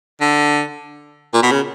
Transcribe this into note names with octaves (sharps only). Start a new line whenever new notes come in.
D3
A#2
B2
C#3